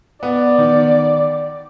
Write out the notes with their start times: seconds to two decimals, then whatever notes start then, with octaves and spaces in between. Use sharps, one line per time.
0.23 B3 D5
0.58 D#3